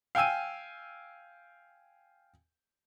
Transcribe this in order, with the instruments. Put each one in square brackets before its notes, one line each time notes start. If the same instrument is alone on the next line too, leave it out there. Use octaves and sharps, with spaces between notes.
[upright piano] F5 G5 G#5 E6 D#7